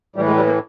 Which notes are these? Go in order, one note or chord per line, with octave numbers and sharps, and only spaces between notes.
A2 E3 G3
G#3
G3
A#3